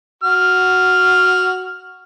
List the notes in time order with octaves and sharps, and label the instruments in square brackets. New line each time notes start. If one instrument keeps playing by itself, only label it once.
[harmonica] F#4 F6